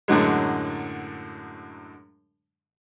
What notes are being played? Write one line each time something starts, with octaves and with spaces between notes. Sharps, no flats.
F#2 A2 D3 F#3 G#3